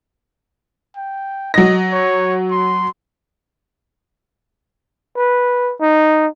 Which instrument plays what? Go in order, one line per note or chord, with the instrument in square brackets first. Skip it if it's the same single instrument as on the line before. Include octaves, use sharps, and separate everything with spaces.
[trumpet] G5
[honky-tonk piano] F#3 A#6 [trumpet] D#5
[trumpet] C#5
C6
[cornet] B4
D#4